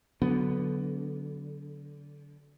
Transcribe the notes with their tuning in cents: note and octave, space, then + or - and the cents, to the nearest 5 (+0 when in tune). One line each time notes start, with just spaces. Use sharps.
D3 -20 F#3 +0 B3 +0